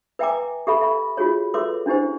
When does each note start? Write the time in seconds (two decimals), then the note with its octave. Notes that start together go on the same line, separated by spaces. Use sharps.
0.19 B4 E5 G5 G#5 A#5 D6
0.67 G4 A4 E5 A5 B5
0.81 E5 B5
1.17 F4 F#4 G#4 C#5
1.54 A4 B4 C#5 E5 C6 D6
1.86 C#4 D4 E4 G4 C5